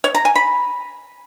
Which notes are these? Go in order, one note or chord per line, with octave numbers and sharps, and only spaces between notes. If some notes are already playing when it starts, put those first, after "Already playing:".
C#5
A#5
G#5
B5